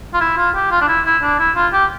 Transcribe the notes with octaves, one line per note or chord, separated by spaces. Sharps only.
F4
E4
F4
G4
F4
D4
E4
E4
D4
E4
F4
G4